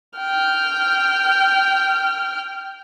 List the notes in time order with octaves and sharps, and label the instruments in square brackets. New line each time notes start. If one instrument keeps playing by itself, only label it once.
[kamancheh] G5 F6